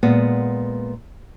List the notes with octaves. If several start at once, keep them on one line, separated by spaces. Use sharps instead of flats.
A#2 G#3 B3